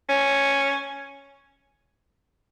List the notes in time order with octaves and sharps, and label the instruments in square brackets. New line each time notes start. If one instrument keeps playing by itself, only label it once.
[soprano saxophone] C#4